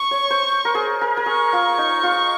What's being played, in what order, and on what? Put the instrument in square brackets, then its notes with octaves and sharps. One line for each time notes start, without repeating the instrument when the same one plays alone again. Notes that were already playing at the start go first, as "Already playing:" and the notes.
Already playing: [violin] C#6
[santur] C#5
C5
A#4
G#4
A#4
A#4
[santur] G#4 [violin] C#6
[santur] F4
D#4
F4